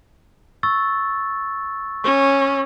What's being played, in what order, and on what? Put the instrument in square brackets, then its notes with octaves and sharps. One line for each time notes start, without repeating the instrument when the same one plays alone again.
[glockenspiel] C#6 E6 A6
[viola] C#4 [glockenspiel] C#6